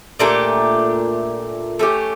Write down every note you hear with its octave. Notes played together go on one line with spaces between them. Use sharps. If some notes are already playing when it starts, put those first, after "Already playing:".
A#2 A3 D4 G4
A3 C#4 G4